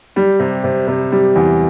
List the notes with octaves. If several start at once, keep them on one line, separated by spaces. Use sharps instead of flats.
G3
C3
C3
C3
G3
E2